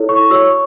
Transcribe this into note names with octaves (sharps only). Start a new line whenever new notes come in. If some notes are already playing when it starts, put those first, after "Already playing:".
Already playing: E4 A4 C#5
C#6
F#4 C#5 E6
C#6